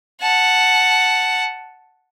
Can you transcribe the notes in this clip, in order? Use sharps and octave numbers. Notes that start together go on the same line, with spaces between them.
F#5 A5